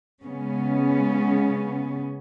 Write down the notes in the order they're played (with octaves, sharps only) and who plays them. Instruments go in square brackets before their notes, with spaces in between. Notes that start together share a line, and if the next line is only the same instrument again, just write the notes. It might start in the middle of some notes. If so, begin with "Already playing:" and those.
[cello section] C#3 G#3 B3 C#4